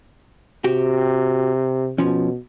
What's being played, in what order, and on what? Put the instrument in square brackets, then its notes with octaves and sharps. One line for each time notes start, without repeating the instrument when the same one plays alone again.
[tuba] C3 [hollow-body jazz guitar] F#4 G4
[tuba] B2 [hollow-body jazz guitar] F3 C#4